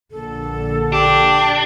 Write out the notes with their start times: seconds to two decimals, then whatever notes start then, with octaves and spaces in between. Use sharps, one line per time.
0.11 A#1 D3 A4
0.92 D4 G4